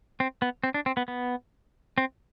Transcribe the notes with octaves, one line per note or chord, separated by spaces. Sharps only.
C4
B3
C4
D4
C4
B3
B3
C4